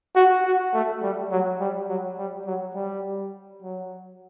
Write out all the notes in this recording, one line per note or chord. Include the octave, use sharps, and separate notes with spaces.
F#4
F#4
A3
G3
F#3
G3
F#3
G3
F#3
G3
F#3